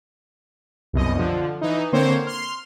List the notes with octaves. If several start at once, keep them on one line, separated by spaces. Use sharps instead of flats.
C2 F#2 B2 D#5
D3 F3
E3 D#4
D3 A#3 C4 C5 C#5
C6 F6